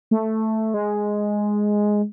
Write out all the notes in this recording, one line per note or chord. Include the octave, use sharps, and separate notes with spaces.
A3
G#3